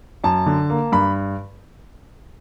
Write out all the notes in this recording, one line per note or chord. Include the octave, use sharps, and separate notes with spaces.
F#2 A5
D3
A#3
G2 B5